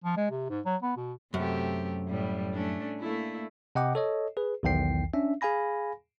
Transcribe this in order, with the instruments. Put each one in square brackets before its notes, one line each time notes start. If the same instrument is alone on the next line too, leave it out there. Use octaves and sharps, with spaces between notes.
[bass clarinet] F3
G#3
C3
G#2
F#3
B3
B2
[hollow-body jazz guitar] F#2 [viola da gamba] C3 A3 G4
[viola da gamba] A2 G3
A3 C#4 D4
A3 A#3 E4
[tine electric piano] C3 D#5 F#5 G5 D6
A4 C#5 D#5
G#4 B4
B1 E2 D#3 G5 C7
C#4 D4 E5
G#4 F5 G#5 B5 A#6